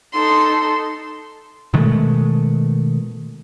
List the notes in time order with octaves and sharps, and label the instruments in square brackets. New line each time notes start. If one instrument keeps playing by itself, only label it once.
[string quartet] D#4 A4 C6
[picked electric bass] B2 D#3 G#3 A3